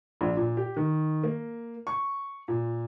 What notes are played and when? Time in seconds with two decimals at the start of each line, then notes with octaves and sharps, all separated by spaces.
0.21 A#1
0.37 A#2
0.57 G4
0.77 D#3
1.23 A#3
1.87 C#6
2.48 A#2